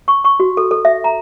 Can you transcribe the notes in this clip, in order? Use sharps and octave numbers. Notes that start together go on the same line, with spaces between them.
C#6
C#6
F#4
A4
A4
E5
A#5